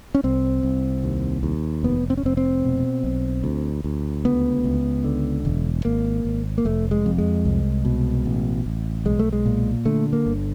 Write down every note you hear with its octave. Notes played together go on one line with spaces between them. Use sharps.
C#4
C2 C4
C2
D#2
D#2
F1 B3
C4
C#4
F1 C4
C4
B2
B1
D2
D2
C#2 B3
C#2
D3
E1
G#1 A#3
G#1
A#3
F1 A3
G#3
F2
G#3
C2
B2
A1
A1
B1 G#3
A3
G#3
A#2
D3 A3
A#3
G1